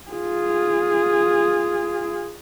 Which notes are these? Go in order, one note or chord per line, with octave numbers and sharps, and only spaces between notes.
F4 G#4